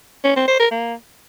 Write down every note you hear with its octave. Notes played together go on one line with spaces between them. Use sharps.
C#4
C4
C5
A#4
A#3